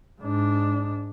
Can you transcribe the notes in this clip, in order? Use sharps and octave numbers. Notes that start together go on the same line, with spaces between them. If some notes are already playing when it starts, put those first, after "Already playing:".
G#2 D4